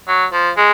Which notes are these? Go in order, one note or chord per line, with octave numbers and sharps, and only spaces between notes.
F#3
F3
G#3